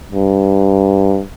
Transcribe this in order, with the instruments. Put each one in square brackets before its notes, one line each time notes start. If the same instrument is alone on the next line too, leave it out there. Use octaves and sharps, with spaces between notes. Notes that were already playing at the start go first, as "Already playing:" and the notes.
[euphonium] G2